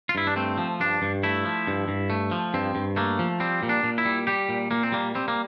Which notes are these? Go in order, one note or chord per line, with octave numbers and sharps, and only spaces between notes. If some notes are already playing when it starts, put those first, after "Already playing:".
F4
G2 E4
D4
A3 C4
F3
G2 D4
G2
A3 E4
F3
G2
G2
A3
F3
G2 C4
G2
A3 A#3
F3
G3 C4
A#2
D4
A#2
E4
G3
G3 G4
A#2
A#2 A#3
C4
G3 A#3
G3 C4
A#3